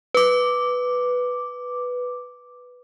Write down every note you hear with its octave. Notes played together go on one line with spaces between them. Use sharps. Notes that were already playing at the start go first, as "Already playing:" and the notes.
B4 D6